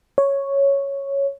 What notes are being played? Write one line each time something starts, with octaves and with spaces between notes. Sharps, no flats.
C#5